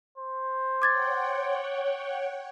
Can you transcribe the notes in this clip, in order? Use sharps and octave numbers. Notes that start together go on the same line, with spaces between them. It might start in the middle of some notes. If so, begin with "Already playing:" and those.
C5
C#5 F#5 G5 D6 G#6 A6